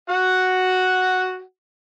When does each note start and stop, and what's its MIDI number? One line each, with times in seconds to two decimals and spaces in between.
0.09 1.42 66
0.09 1.42 78